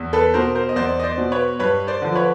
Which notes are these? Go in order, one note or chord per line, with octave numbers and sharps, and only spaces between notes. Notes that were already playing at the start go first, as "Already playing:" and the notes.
Already playing: E2
A4 B4
B2 A#4 C5
A#4 C5
D#5
E2 C5 D5
D#5
C5 D5
B2
B4 C#5
G2 B4 C#5
C5 D5
D3 F3
B4 C#5